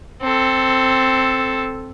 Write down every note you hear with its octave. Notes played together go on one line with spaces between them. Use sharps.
C4 A4